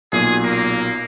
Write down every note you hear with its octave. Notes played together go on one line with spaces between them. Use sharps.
B1 A#2 G#4
A#3